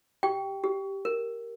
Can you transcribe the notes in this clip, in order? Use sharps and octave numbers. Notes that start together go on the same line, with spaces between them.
G4 G5
G4
A#4